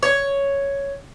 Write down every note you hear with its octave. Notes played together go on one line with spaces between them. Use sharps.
C#5